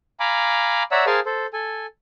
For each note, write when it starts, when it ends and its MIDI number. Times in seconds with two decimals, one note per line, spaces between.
0.20 0.83 77
0.20 0.83 80
0.20 0.83 82
0.20 0.83 83
0.20 0.83 86
0.91 1.05 73
0.91 1.05 74
0.91 1.05 76
0.91 1.05 78
0.91 1.05 82
0.91 1.05 88
1.06 1.20 68
1.06 1.20 70
1.06 1.20 72
1.06 1.20 77
1.06 1.20 80
1.06 1.20 81
1.26 1.46 69
1.26 1.46 72
1.53 1.86 69
1.53 1.86 80